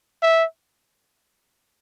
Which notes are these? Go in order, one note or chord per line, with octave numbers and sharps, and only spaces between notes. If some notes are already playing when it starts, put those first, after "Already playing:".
E5